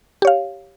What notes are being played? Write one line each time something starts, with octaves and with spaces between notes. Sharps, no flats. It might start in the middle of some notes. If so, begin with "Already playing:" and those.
G4 C#5 F5